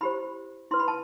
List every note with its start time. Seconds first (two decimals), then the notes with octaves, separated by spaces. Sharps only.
0.01 E4 G4 C5 B5
0.71 E4 B4 C6
0.79 B5
0.88 A5